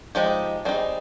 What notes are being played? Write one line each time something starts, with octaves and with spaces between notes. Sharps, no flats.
F3 G#3 D#4 G4
G3 C4 D#4 G#4